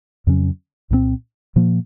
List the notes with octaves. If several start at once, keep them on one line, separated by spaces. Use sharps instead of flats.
F2 C#3 F#3 C#4
C2 A#2 F#3 C4
A#2 F3 A#3